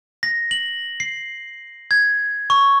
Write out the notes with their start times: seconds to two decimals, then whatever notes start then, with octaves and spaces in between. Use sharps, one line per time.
0.23 A#6
0.51 F#7
1.00 C7
1.91 G#6
2.50 C#6